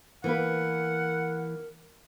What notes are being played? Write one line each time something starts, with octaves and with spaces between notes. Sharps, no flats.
E3 A#3 A#4 B4 F#5